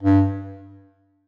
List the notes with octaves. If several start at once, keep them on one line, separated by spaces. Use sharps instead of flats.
G2